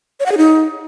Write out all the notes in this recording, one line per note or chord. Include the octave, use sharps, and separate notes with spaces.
C#5
F#5
G#4
D#4